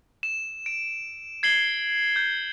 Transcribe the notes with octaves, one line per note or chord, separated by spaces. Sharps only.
E7
D7
G#6 C7 F#7 G7
G6